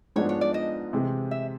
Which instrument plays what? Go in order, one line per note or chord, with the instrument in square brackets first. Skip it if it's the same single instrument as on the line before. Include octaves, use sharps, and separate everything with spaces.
[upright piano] G#2 F3 G#3 B3 D4 [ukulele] C#5
[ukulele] C#5
D5
D#5
[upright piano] C3 E3 G#3 C4
[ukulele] E5